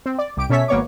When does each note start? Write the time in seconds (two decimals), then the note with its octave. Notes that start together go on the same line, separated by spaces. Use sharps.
0.06 C4
0.18 D5
0.37 C2 G4 D7
0.50 B2 C#4 A4 C#5 E5 B6
0.68 G#1 A#3 B3 C#5 C#6 D6